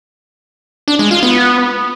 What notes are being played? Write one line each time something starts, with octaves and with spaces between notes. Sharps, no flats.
D4
G#3
F4
B3